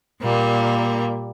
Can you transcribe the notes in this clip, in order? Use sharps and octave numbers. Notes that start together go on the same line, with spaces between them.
A#2 G3 A#3